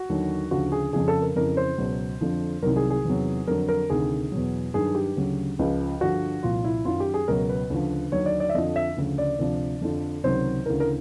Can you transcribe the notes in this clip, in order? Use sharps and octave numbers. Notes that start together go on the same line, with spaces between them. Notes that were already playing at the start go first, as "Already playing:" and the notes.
Already playing: F#4
D#2 D3 F#3
D2 C#3 F3 F#4
G#4
F2 C#3 F3 G#4
A4
A#4
F2 C#3 E3 A#4
C5
C#2 B2 F#3
F2 D3 F3
C2 C3 D#3 F#3 A#4
G#4
G#4
E2 C3 D#3 F#3
F2 D3 F#3 A#4
A#4
D2 C3 D#3 G#4
E2 B2 F#3
G2 D#3 F#3 G#4
G4
D2 C#3 F#3
C#2 C#3 F3
G2 D3 F3 F#4
C2 A#2 F3 F4
E4
F#2 D#3 F#3 F4
G4
G#4
C#2 B2 F#3 A#4
B4
D2 C#3 F3
D#2 D3 F#3 C#5
D5
D5
E5
F2 D3 F3 D#5
E5
D2 C#3 F3
D5
D2 C3 F3
F2 D3 F3
C#2 C3 D#3 F#3 C5
D2 C#3 E3 A#4
A#4